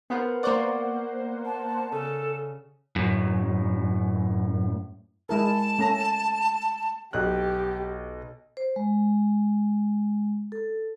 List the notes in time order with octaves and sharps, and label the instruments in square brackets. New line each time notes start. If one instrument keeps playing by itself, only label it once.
[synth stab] B3 [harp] A#4 C5 F#5
[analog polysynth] A#3 C5 F#5 [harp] D5 C#6 D6
[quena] A5
[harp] C#3 [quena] A4
[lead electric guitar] F#2 A2
[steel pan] G#3 E4 A#4 [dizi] A5
[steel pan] A3 C#4 A#5
[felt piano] B1 F#6 [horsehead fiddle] G4
[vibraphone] C5
G#3
A4